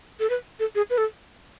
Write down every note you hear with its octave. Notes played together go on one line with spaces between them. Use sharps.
A4
B4
A4
G#4
B4
A4